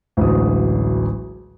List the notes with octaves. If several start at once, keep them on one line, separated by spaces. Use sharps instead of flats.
A1 D2 F#3 G#3 D#6